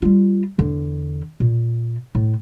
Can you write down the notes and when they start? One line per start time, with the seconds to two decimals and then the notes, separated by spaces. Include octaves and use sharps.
0.02 G3 F4
0.58 E2 D3
1.40 A#2
2.15 A2